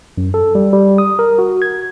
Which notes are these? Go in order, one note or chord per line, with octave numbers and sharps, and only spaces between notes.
F#2
A4
G3
G3
D#6
A#4
F#4
G#6